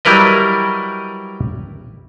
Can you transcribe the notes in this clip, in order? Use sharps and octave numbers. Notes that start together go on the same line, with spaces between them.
F#3 G3 E4 A#4 B4 D#5